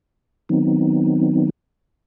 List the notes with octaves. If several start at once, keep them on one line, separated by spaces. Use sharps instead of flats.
D#3 F#3 B3 C4 D#4